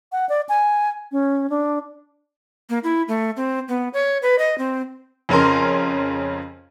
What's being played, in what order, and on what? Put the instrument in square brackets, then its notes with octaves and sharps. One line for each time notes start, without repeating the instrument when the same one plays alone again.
[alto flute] F#5
D5
G#5
C#4
D4
[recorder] A#3
E4
A3
C4
B3
C#5
B4
D#5
C4
[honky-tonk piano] F2 C#3 C#4 A#4 C6